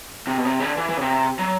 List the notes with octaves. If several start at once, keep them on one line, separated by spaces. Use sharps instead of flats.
C3
B2
C3
C#3
D3
E3
E3
C#3
C3
F#3